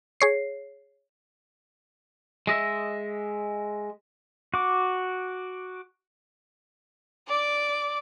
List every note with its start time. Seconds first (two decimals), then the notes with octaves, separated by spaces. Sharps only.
0.21 G#4 C#5 C7
2.47 G#3 D#5 E5
4.54 F#4 D6
7.28 D5 D6